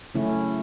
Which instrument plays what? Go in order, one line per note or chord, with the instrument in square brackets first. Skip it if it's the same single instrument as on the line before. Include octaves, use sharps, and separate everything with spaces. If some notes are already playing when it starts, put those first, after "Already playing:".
[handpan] C#3 F#3 A3 C#4 E4